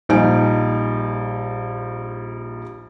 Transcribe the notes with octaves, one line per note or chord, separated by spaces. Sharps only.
A#1 G3 D#4 G#5 D7